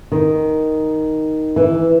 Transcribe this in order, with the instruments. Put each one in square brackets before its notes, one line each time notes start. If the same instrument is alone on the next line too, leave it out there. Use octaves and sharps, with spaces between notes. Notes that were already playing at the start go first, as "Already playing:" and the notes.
[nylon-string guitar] D#3
E3